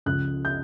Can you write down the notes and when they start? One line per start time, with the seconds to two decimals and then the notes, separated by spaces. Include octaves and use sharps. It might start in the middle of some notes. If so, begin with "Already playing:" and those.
0.06 C#2 C#3 F3 F#6
0.45 G6